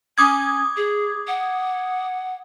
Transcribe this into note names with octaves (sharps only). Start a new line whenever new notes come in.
C#4 D6 D#6 G#6
G#4
F#5